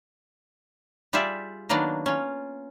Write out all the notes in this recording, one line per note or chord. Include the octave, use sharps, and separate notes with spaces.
G3 F4 G4 G#4 D5 E5
D#3 F#3 A#3 B3 D4
C#4 F4